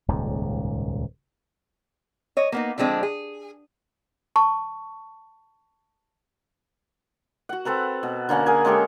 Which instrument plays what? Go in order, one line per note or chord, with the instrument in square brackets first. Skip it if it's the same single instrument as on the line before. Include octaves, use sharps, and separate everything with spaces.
[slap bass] D#1 C#2 G#2
[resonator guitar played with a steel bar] C#5 D#5
A#3 B3 D#4
D3 F3 G#3 C4 D4
G#4
[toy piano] A5 C#6
[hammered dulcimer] F#4 F#5
C4 A4 B4 A#5
B2
D3 A#3 C#4 F#5
G#4 A#4 G#5
G#3 C#4 G4 A4